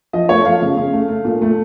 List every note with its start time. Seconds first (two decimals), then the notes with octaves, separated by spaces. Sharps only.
0.13 F3 D#5
0.29 A3 C#5
0.45 F3 F5
0.62 C#3
0.77 C#3
0.93 A3
1.09 A3
1.25 A#2
1.42 A3